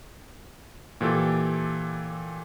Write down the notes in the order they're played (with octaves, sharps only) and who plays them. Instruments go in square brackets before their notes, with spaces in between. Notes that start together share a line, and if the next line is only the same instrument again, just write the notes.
[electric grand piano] A#2 E3 G4 A4